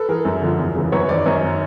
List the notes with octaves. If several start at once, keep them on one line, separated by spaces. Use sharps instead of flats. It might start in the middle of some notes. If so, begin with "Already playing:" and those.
Already playing: A4 B4
E3 G#4 A#4
F#2
D3 F3
E2
C#3 E3
F#2 B4 C#5
D#3 C5 D5
F#2 C#5 D#5
D#3